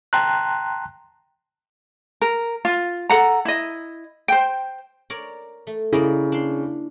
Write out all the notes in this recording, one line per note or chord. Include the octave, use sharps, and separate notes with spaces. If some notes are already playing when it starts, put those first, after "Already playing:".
G5 A5 A#5 C6 F#6
A#4
F4
A4 F#5 A#5
E4 D#5
C5 G5
A#4 C#5 D5
A3
C#3 A#3 E4 D5 D#5
D4 C6